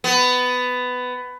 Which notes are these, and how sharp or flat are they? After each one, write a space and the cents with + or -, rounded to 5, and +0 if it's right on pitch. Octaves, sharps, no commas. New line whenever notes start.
B3 +15